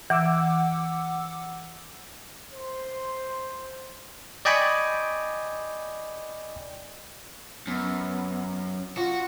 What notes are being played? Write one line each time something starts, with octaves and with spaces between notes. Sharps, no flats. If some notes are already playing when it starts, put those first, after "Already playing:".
E3 F#5 D6 E6
C5
D5 D#5 G5 G#5 B5 C#6
F#2 B3
F4 F#4